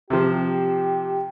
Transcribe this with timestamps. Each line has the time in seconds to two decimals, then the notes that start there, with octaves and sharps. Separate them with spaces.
0.10 C3 F3 G4